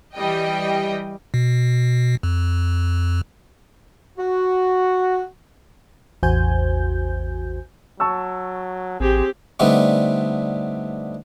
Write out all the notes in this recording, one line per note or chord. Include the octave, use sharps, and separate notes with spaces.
E3 G3 D#5 G5
B2
F2
F#4
A1 E2 F#4 C5 G#5 G6
F#3 A5 C#6 E6
A1 C4 G4 G#4
D3 G3 A3 B3 C4 D#4